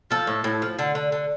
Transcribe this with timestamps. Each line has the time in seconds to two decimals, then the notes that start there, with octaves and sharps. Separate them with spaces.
0.11 F3 A4
0.27 A2
0.44 A2
0.62 F3
0.79 D3
0.95 D3
1.12 D3